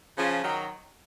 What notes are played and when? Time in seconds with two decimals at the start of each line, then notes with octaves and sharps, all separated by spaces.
0.18 C#3 F3
0.43 D#3 F#3